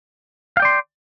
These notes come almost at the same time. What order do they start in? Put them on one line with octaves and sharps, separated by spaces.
F5 G5 D5 C6